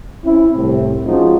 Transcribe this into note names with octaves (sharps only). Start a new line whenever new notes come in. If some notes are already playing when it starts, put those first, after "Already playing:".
C4 C#4 E4
C2 A2 C4
F3 G#3 C#4 D#4 F4 F#4